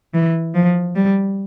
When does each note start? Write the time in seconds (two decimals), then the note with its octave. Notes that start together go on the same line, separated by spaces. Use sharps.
0.14 E3
0.54 F3
0.96 G3